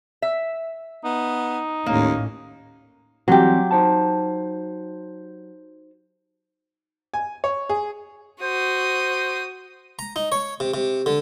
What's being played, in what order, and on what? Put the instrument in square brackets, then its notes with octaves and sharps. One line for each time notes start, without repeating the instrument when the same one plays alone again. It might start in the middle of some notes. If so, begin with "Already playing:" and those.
[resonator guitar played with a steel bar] E5
[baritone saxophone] B3 [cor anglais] D#4
[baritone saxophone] D#2 [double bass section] A2 C#4 [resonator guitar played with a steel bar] A#3
[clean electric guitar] E3 G3 C4 [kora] F#3 G4
[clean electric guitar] D#4 C5 A5
[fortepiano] G#5
C#5
G#4
[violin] F#4 D#6 [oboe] C5
[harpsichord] A#5
D#4
C#5
C3
C3
D3